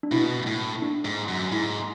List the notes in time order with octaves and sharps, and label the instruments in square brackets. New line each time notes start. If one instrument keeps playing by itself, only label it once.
[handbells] D4
[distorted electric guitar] B2 [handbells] E4
[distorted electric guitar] A2
[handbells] D4
[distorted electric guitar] G#2
F#2
[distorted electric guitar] G#2 [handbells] E4